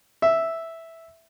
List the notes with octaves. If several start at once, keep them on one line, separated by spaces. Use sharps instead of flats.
E5